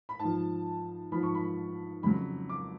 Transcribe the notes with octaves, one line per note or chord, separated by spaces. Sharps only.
B5
G#2 A5
F3
G#2 F3 B5
C#6
B5
F2 C#3 F#3 B5
D6